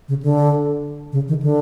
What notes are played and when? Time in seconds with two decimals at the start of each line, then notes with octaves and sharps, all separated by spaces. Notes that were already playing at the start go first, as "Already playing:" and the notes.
0.08 C#3
0.22 D3
1.12 C#3
1.28 D#3
1.42 D3